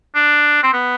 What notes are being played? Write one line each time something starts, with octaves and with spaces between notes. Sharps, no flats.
D4
C4
B3